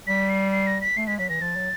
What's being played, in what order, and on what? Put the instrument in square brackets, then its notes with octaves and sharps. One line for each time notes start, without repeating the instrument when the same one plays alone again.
[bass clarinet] G3 [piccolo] B6
[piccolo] C7
C7
A#6
B6
[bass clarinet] A3 [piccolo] C7
[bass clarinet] G#3 [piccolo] B6
[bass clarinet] F#3 [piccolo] B6
[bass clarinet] E3 [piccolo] A#6
[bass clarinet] F3 [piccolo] A6
[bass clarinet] F#3